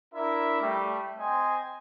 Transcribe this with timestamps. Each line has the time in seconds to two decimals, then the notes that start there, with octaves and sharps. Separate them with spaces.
0.14 D4 E4 A#4 E5
0.60 G3 A3
1.18 C4 C5 D#5 G#5